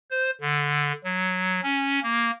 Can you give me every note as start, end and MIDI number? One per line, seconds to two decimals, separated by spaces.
0.10 0.30 72
0.41 0.92 50
1.04 1.60 54
1.63 1.99 61
2.03 2.31 58